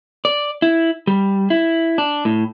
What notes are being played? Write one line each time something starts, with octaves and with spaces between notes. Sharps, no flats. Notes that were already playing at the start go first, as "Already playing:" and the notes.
D5
E4
G3
E4
D4
A2